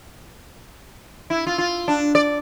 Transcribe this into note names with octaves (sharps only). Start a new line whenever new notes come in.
E4
F4
F4
D4
D5